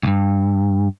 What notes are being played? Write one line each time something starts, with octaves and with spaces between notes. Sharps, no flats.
C#2 G2